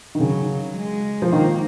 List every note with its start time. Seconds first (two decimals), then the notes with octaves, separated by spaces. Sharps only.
0.15 D#3
0.20 C#3 F#3
0.76 G#3
1.22 F3
1.32 D#3 A#3